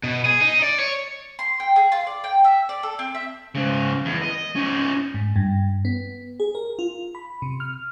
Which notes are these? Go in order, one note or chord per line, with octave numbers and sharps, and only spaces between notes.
B2
G#4
D#4
D5 D#5
C#5
C6
G5
G#4
F4
D5
G5
E5
D5
A4
C4
E5
G#2 C#3
E2
D#5
C#4 D#4
G#2
G2
B3
G#4
A#4
F4
B5
C3
F6